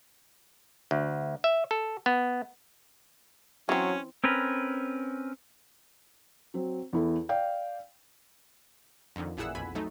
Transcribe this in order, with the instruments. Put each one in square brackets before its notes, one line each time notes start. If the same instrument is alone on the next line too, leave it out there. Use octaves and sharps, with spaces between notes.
[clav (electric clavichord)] D2
E5
A4
B3
[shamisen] E3 C4 [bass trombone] F#3 [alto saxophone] C#4
[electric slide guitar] C4 C#4 A#4 B4
[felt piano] F#3 C4
E2 E4 A4
D5 F5 G5
[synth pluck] F2 D3 D#3
A1 A#2 E4 G#4 F#5 E6
B1 F2 G#5 B5
F#3 A3 D#4